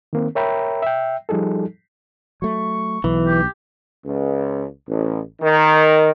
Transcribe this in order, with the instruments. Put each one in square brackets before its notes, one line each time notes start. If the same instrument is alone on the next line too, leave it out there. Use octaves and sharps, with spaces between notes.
[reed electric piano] D#3 A#3 C4
A#4 C#5 E5 G5 A#5 B5
E5 G5
F3 G3 D#4 G#4 A4
[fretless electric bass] F#3 A3 [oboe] C#6
[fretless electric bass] B1 [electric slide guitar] E3
[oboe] G4
[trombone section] C#2
A1
D#3